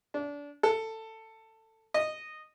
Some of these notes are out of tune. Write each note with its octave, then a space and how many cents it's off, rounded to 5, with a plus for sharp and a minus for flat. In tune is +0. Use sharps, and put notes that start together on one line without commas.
D4 -25
A4 +15
D#5 -10